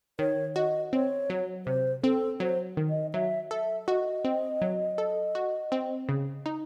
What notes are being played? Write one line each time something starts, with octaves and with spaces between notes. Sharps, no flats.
D#3 C#5
F#4 D#5
C4 C#5
F#3
C3 C5
C4 A4
F#3 C5
D#3
D#5
F#3 E5
A4 E5
F#4 D#5
C4
F#3
A4
F#4
C4
C#3
D#4